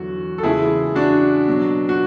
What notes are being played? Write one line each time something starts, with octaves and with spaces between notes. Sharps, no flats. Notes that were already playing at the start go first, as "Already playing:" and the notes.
Already playing: E2 D3 F#3 F#4
A4
E2 C#3 G#3 E4 G#4
D4 F#4
B2 F#3
F#4